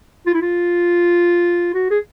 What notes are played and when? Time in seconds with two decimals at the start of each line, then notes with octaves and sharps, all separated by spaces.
0.27 F4
0.34 E4
0.42 F4
1.74 F#4
1.91 G#4